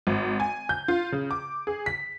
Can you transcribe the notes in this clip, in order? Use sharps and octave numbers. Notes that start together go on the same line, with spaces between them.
G#1
G#5
G6
F4
C#3
D6
G#4
B6